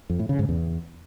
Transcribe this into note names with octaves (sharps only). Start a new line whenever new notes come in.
F2
A2
C#3
G#2
E2